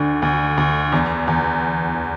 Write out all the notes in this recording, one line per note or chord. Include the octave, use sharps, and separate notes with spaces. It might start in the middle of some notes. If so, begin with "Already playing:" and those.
Already playing: D2 D3
D2
D2
E2
E2